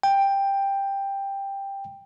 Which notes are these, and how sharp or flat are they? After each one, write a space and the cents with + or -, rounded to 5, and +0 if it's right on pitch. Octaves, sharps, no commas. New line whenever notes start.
G5 +10